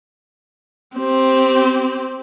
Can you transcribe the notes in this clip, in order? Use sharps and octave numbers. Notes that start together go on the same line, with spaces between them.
C4 G4